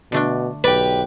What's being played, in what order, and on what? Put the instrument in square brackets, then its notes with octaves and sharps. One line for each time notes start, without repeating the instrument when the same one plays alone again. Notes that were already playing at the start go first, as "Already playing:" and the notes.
[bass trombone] B2 [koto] D3 A3 D4
[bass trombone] B1 [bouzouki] G4 G5 [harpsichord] B4 [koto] D5